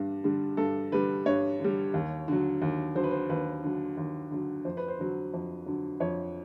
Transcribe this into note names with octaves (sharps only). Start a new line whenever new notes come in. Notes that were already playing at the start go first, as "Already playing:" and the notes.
Already playing: G2 D3 G3
D3 G3
G2 A4
D3 G3 B4
G2 C#5
D3 G3
D#2
D3 F#3
D#2
D3 F#3 C5
B4
C5
D#2 B4
D3 F#3
D#2
D3 F#3
F2 C5
B4
C5
D3 F#3
F2
D3 F#3
F2 C#5